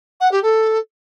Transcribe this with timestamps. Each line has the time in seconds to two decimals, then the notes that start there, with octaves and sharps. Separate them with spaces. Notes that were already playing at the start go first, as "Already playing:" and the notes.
0.20 F#5
0.32 G4
0.43 A4